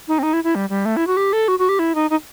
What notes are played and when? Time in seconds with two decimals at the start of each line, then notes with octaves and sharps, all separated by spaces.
0.08 D#4
0.19 C4
0.23 D#4
0.33 E4
0.44 E4
0.55 G3
0.70 G3
0.85 A3
0.97 E4
1.07 F#4
1.17 G4
1.33 A4
1.48 F#4
1.59 F#4
1.69 G4
1.79 E4
1.95 D#4
2.10 D#4